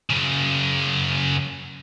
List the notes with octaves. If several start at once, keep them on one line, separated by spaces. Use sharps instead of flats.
F#2 C#3